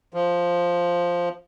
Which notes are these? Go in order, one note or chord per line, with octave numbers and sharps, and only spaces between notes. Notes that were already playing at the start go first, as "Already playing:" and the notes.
F3